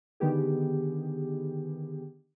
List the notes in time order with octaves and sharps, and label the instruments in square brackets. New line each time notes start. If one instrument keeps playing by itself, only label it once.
[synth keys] D3 D#3 B3 G4 G#4